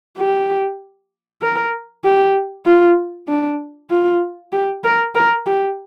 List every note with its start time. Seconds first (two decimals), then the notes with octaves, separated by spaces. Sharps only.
0.17 G4
1.42 A#4
2.04 G4
2.66 F4
3.28 D4
3.90 F4
4.52 G4
4.84 A#4
5.15 A#4
5.46 G4